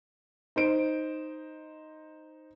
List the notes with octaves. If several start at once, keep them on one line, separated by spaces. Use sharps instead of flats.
D#4 C5 D7